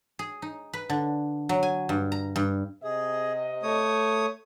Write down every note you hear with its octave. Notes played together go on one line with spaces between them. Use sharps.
G#4
D#4
B4
D3
F#3
G#5
G2
A#5
G2
C3 G#4 D#5
A3 C#5 D#6